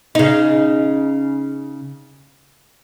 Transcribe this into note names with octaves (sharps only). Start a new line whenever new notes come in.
C#3 D#4